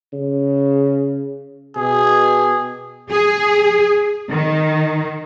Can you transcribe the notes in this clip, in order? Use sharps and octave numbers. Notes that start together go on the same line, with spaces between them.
C#3
B2 G#4
G#4
D#3